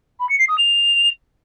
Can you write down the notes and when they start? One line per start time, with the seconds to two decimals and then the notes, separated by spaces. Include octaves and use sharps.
0.19 B5
0.29 C#7
0.39 C7
0.48 D#6
0.58 F7